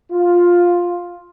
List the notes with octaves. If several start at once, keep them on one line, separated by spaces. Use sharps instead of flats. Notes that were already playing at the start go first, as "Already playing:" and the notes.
F4